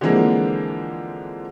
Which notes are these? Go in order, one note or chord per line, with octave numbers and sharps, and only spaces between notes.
D3 E3 F3 G#3 A#3 C4